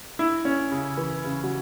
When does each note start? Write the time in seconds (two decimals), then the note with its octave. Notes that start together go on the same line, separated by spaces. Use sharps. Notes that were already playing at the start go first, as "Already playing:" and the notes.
0.19 E4
0.45 C#4
0.72 C#3
0.97 E3
1.24 C#3
1.44 F#3